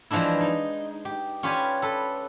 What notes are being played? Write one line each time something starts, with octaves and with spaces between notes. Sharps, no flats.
E3 F3 G#3 D4 E4
D#4
G4
C#4 F4 G4 B4 D5 G#5
A4 B4